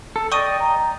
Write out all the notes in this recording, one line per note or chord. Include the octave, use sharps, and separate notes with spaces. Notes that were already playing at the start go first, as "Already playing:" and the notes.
A4
D5 D#5 G5 C#6 D#6 D#7
A#5